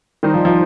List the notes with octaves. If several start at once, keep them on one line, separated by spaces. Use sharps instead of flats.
D#3 G3 D#4 C5
F3
F3